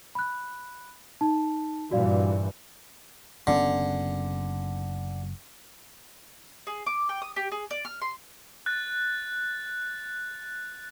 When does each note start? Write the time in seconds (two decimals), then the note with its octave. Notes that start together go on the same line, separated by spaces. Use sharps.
0.15 B5 F#6
1.21 D#4 A5
1.91 G2 A#2 E3 F#4 D5 F5
3.47 F#1 D3 B3 C#4
6.67 G#4
6.86 D6
7.09 G5
7.22 D#6
7.36 G4
7.52 G#4
7.71 D5
7.85 F6
8.01 C6
8.66 F#6 A6